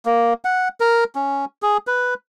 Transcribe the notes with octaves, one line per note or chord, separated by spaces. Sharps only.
A#3
F#5
A#4
C#4
G#4
B4